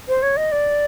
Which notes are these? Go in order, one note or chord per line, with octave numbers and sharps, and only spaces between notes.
C5
C#5
D#5
D5